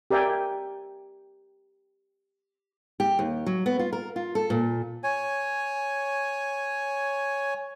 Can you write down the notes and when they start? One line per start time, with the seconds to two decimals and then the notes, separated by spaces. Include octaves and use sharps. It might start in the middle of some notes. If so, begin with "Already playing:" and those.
0.11 G4 A#4 D5 E5 G5 G#5
3.00 G4
3.19 D#2
3.46 F#3
3.66 B3
3.79 F4
3.93 A#4
4.16 F4
4.35 A4
4.50 A#2
5.04 C#5 G#5